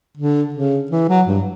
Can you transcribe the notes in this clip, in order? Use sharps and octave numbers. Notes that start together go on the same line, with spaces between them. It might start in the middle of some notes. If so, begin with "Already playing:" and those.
D3
C#3
E3
F#3
G2